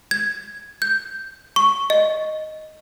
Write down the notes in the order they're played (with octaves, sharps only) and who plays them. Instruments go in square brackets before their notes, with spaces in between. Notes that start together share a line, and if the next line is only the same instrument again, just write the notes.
[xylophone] G#6
G6
C#6
D#5